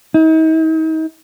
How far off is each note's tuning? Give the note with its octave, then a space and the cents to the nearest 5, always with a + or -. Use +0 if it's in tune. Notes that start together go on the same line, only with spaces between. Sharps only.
D#4 +40